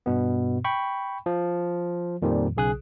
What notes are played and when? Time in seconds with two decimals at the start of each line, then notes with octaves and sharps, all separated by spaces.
0.06 G2 B2 B3
0.64 G5 B5 C#6
1.26 F3
2.22 F2 A#2 D#3 F3 G3
2.57 B1 C#3 G#4 D#6 F#6